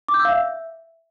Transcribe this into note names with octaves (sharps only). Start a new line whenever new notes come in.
D6
G6
E6
F5
E5